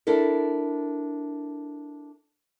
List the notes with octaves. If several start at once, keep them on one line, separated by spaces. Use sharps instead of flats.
D4 E4 A4 A#4